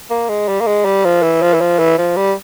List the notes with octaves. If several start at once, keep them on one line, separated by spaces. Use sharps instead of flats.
A#3
G#3
G3
A#3
G#3
G3
F3
E3
F3
E3
F3
E3
F3
G3